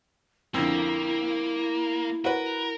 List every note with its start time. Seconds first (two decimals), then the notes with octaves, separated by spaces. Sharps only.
0.54 F2 D3 A#3 E4
2.25 F#4 A#4 B4